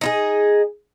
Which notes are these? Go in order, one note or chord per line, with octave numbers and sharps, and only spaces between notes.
D#4 E4 G#4